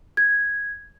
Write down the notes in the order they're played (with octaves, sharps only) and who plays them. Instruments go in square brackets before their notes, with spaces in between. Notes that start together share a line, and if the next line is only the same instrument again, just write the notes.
[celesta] G#6